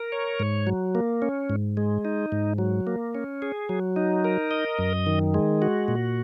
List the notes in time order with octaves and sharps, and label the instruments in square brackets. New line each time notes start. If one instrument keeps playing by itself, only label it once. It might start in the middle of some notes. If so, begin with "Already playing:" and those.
Already playing: [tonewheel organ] A#4
C#5
G#2
F#3
A#3
C#4
G#2
G#3
D#4
G#2
F#3
A#3
C#4
G#4
F#3
D#4
A#4
D#5
F#2
D#3
G#3
F#4
A#2